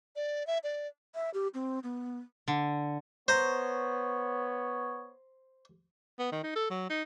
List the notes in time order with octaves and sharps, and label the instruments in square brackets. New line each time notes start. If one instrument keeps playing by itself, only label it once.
[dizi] D5
E5
D5
[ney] E5
G4
C4
B3
[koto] D3
[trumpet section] B3 C#5 [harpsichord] C5 A#5
[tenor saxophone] B3
D#3
D#4
A4
F#3
D#4